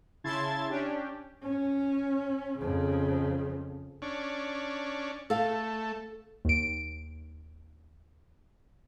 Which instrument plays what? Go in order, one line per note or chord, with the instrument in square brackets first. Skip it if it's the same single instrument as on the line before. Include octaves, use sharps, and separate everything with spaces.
[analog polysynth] C#3 E4 A5 C6 G#6 A6
C#4 D4 G4
[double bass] C#4
F2 C#3
[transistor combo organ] C#4 D4
[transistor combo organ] A3 [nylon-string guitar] A4 F5
[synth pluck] D#2 D7